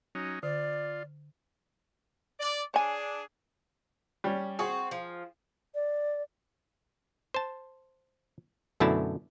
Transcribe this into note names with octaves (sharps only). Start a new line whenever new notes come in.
F#3 C#4 D#4
D3 F4 D5
D5
D4 G#4 C#5 G#5
G3 C#4
C4 F#4 G#4
F3
D5
C5 A5
F#2 B2 D3 A3 E4 A5